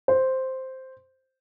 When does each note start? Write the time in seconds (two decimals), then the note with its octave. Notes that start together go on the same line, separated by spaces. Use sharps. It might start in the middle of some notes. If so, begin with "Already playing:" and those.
0.08 C5